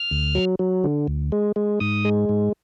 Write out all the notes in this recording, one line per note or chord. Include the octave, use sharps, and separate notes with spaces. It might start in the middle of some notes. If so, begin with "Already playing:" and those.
Already playing: F6
D2
F#3
F#3
D3
D2
G#3
G#3
G#2 D#6
G#3
G#2